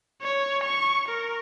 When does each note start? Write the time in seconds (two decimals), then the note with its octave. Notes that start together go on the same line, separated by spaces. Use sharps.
0.22 C#5
0.64 C#6
1.08 A#4